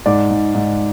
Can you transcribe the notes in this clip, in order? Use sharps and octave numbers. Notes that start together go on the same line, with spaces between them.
G#2 D5
G#2
G#2